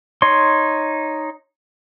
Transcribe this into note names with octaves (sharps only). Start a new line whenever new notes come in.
D#4 C#5 C6